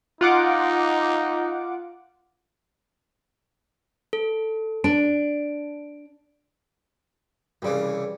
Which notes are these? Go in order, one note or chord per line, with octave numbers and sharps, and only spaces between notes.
D#4 F4 F#5 D6
A4
D4 D7
C2 C#3 E3 G3 G4